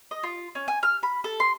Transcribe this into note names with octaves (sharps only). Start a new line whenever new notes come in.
D#5
F4
C#4
G#5
F6
B5
A4
C6